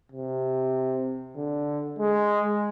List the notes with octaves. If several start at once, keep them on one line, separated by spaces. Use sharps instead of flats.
C3
D3
G#3